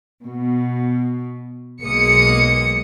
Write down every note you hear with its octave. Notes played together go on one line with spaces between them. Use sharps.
B2
B1 G#3 A#3 D#6 C#7